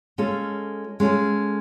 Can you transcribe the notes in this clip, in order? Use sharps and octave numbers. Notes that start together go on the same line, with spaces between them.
G#3 C#4 F4 A4
G#3 C#4 F4 A4